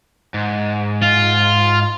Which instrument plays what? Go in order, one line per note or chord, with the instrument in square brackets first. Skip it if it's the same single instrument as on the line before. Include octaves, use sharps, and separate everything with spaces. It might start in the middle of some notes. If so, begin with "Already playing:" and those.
[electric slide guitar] G#2
[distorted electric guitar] F4